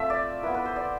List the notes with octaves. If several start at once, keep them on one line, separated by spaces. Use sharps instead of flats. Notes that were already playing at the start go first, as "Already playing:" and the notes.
Already playing: A3 C4 F4 E5
D5
B3 E4 B4
B4
C5
D5